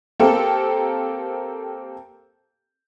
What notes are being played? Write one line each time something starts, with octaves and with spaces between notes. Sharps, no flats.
A#3 C4 G4 A4